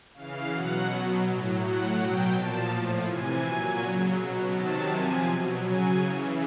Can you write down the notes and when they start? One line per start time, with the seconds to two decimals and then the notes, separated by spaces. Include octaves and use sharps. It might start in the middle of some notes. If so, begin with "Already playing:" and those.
0.14 C#3 E3 F5
0.50 B2 F#3 F#5
0.87 B2 F#3
1.24 A2 F#3
1.59 A2 F#3 F#5
1.96 B2 F#3 G5
2.33 A#2 F3 A5
2.69 A2 F3
3.06 C3 E3 G#5
3.42 A#2 F#3 G#5
3.79 C#3 F#3
4.16 B2 F#3
4.52 C3 D#3 F#3 A5
4.88 C3 F3 G#5
5.25 B2 F#3
5.61 C#3 F#3 G#5
5.99 C#3 E3